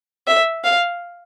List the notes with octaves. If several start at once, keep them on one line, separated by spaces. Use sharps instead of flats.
E5
F5